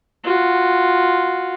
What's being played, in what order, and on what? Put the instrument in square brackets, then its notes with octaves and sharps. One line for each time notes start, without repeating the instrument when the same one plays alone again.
[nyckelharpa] F4 F#4